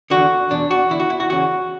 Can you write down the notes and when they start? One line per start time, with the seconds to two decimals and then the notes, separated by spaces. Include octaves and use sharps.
0.10 E2 D3 F#4
0.50 E2 B2 D4
0.71 F#4
0.90 E2 D3 E4
1.00 F#4
1.10 E4
1.20 F#4
1.30 E2 C#3 E3 F#4